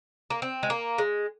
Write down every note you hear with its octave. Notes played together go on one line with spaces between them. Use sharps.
A#3
C4
G#3
A#3
G#3